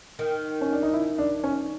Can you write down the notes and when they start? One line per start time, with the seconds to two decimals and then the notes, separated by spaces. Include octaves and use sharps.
0.19 D#3
0.61 C#4
0.73 D4
0.83 D#4
0.93 E4
1.18 D4
1.44 C#4